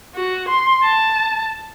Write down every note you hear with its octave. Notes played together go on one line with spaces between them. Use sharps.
F#4
C6
A5